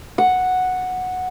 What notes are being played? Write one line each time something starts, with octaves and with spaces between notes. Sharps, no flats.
F#5